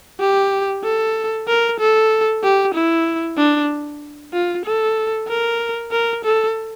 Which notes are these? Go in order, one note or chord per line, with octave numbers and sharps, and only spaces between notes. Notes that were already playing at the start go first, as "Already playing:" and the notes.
G4
A4
A#4
A4
G4
E4
D4
F4
A4
A#4
A#4
A4